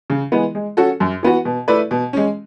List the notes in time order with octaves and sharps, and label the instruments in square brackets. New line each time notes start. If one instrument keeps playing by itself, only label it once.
[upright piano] C#3
E3 G#3 B3
G#3
C#4 F#4 A4
F#2
E3 B3 F#4
B2
A3 E4 B4 D5
B2
G#3 C#4